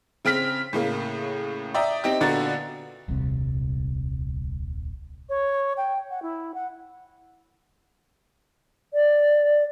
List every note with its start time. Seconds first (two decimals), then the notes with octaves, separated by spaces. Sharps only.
0.25 C#3 C4 F6 B6
0.73 A2 C#3 A#3
1.74 D5 E5 G5 A#5 D#6
2.04 C4 D#4 G4
2.21 A#2 D3 B3 F#4 A#5 A6
3.08 D#1 C2 C3
5.29 C#5
5.77 G5
6.10 F#5
6.22 E4
6.54 F#5
8.94 D5